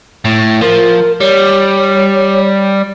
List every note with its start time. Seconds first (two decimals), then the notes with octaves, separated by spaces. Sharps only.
0.25 A2
0.61 F3 A#4
1.20 G3 C#5